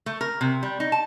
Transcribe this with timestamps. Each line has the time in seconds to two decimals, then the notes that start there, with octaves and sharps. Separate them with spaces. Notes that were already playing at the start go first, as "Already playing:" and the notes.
0.06 A3
0.21 A#4
0.41 C3
0.63 G3
0.80 D#4
0.92 A5